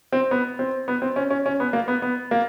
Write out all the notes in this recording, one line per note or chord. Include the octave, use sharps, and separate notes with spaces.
C4
B3
C4
B3
C4
C#4
C#4
C#4
B3
A#3
B3
B3
A#3